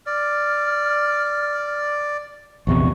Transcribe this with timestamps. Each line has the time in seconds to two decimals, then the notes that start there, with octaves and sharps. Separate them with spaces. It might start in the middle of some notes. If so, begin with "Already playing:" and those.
0.07 D5 F6
2.67 A#1 E2 C3 C#6